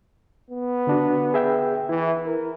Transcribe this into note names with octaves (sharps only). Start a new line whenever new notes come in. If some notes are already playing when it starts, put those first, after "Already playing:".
B3
D3 D4 F#4
G#4 E5 G5
E3 E4
A#4